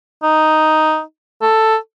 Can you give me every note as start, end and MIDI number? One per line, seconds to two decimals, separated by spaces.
0.23 1.01 63
1.42 1.76 69